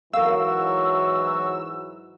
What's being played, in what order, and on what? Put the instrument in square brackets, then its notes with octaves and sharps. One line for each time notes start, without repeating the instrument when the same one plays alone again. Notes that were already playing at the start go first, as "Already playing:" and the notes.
[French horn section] G#2 E3 F#3 [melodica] F#4 [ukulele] A#4 F5 [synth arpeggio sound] E6